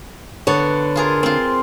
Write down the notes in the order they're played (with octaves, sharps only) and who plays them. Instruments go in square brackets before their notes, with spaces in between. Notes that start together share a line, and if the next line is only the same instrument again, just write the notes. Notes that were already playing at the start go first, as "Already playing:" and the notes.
[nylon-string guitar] D3 C#5 [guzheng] B3
[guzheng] F4 G#4 A#4
C4 F4